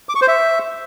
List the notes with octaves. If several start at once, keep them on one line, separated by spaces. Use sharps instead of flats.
D6
C#6
C5
E5